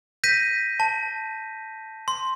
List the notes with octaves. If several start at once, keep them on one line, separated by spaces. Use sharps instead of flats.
G6 A#6 B6 D#7
A5
C6